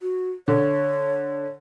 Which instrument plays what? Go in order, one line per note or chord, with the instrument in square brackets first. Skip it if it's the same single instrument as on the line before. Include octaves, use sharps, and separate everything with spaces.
[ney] F#4
[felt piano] D3 [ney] C#5